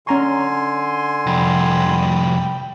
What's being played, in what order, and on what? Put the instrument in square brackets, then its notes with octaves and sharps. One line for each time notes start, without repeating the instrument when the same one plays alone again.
[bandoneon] D3 G#5 C6 [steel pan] C#4 A#5 C#6
[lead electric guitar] C2 F2 [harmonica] G5 B5